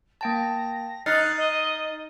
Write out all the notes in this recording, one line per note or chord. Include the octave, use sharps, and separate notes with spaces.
A#3 G5 A5 A#6
D#4 F6 F#6 A6 C7
D#5